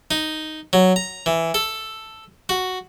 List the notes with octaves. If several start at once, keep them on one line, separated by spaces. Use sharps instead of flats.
D#4
F#3
A#5
E3
A4
F#4